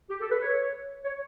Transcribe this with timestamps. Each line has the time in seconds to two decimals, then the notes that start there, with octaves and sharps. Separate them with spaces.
0.10 G4
0.21 A4
0.31 B4
0.41 C#5
1.05 C#5